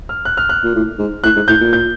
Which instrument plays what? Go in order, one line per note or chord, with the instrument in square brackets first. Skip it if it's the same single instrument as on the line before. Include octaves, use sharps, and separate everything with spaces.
[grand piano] F6
F#6
F6
F#6
[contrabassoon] A#2
A2
G#2
[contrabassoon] A2 [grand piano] F#6
[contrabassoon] G#2
[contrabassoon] A2 [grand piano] G6
[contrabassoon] A#2
[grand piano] G6